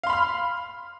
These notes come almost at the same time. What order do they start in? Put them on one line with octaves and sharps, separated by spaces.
F5 C6 B5 F6